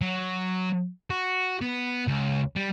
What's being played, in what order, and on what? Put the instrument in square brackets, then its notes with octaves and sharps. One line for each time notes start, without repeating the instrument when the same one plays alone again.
[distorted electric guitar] F#3
F#4
B3
C#2
G3